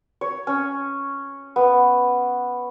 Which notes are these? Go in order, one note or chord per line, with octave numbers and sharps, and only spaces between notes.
C#5
C#4
B3